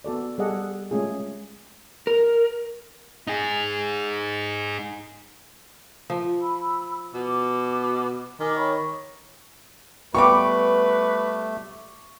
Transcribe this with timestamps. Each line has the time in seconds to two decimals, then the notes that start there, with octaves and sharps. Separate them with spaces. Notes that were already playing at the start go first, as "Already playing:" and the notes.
0.04 B3 F#4 A4 D5
0.38 G3 G#4 A4 D5 D#5 F#5
0.91 G#3 A3 C#4 F4 G#4
2.07 A#4
3.27 D#4 G#4
6.10 F3
6.42 B5 E6
7.14 B2 D6
8.40 D#3 D#5 G#5 D6
8.56 C#5 B5 C#6
10.15 G3 A3 B3 B4 C#6 D6